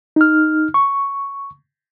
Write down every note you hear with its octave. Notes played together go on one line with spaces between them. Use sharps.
D#4 F6
C#6